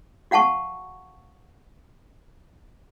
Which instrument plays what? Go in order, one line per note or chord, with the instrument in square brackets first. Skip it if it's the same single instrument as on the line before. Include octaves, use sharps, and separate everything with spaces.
[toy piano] F#4 F5 F#5 A5 C#6